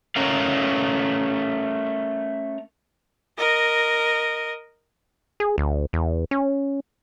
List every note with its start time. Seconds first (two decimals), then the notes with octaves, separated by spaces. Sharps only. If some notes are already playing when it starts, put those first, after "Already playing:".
0.16 A3 C#4 A#4 F5
3.38 A#4 D#5
5.40 G#4
5.58 D2
5.93 E2
6.31 C#4